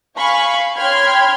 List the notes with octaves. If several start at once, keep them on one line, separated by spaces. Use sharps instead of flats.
F5 G#5 B5 C#6
C#5 G5 B5 C6 F6 G#6